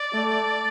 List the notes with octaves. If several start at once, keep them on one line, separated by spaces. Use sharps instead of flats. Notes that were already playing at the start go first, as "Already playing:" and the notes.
Already playing: D5
A3